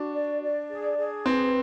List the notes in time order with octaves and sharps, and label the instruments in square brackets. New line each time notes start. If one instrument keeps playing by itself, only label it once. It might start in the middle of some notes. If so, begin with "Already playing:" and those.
Already playing: [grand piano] D4 [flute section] F#4
[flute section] D5
D5
G#4
G#4
[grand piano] C4 [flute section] B4